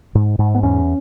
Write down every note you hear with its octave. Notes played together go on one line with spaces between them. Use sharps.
G#2
G#2
B3
E2 C#4